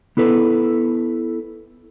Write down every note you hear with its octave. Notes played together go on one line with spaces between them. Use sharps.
B3 E4 A4 B4